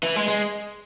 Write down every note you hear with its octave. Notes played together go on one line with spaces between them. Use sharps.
E3
G#3
G#3